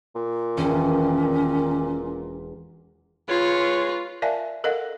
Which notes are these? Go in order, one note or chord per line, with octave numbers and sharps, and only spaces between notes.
A#2
E1 D#3 C#4
G#3 F4 B4 C#5
A#4 D5 E5 F5 G#5 A5
A4 A#4 D#5 F5 F#5